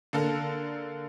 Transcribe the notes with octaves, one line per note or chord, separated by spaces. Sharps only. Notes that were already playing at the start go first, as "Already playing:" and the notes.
D3 A#3 A4 A#4